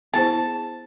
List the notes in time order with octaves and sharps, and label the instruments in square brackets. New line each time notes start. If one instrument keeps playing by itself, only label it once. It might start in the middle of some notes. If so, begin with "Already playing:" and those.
[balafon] B3 E4 G#4 C5 [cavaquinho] A5